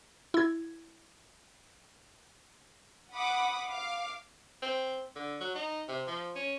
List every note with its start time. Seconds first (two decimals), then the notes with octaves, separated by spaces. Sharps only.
0.34 E4 G#6
3.13 F#5 B5 D6 D#6
3.67 F5 D6
4.62 C4
5.16 D3
5.41 F#3
5.55 D#4
5.88 C3
6.07 F3
6.36 C#4